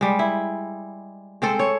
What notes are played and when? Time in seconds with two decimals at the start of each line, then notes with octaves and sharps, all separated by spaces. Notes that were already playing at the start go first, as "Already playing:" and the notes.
0.01 G3 G#3
0.19 E4
1.42 G#3 C4 A4
1.59 C#5